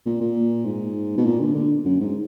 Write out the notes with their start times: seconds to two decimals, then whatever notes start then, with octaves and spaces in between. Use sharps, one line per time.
0.06 A#2
0.21 A#2
0.65 G#2
1.17 B2
1.25 A#2
1.41 D3
1.54 D3
1.85 F#2
2.00 G#2